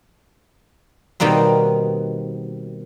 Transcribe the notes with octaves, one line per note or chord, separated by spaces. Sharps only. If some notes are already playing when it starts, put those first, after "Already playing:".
B2 D#3 G3 A#3 C4